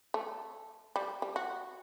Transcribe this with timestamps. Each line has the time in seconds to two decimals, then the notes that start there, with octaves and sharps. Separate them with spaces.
0.14 A3
0.96 G3
1.22 G3
1.36 F#4